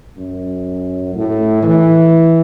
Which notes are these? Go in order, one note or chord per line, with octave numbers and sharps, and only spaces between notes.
F#2
A2
E3